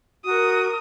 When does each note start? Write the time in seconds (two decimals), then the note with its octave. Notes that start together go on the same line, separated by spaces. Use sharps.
0.25 F#4 A#4 D#6